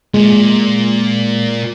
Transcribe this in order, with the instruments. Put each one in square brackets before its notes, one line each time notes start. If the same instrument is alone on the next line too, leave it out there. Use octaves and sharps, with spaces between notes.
[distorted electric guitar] A#2 [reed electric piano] G#3